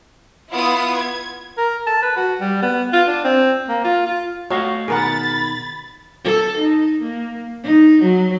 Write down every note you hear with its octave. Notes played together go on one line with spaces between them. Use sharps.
B3 E4 F4 D#6
G#6
A#4
A5
B4
F#4
G3
B3
F4
D4
C4
A#3
F4
F4
A3 F#4 C#5 D#5 F5
B2 D#3 G#4 A#4 F#5 B5 A6
A4
D#4
A#3
D#4
F#3